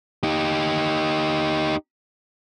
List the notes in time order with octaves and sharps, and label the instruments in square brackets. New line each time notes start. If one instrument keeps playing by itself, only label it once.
[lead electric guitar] D#4 G4